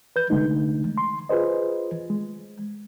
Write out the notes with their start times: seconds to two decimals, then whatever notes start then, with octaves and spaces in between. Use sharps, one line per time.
0.16 B4 G6
0.30 C2 D3 G#3 A3 D#4
0.98 C6
1.29 F4 G#4 B4 C5 D#5
2.10 G#3